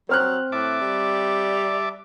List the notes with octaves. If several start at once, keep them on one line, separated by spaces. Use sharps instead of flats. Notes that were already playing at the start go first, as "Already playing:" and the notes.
F#3 C4 F6 F#6
A2 E5 A5 D6
G3